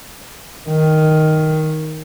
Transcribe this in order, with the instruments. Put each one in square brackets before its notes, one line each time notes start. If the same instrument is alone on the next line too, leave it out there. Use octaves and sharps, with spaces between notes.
[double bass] D#3